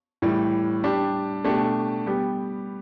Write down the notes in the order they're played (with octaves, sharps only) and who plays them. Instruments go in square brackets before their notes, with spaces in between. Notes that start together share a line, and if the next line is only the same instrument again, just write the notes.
[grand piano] A2 E3 G3
G3 D4 G4
B2 A3 D4 G4
G3 B3 G4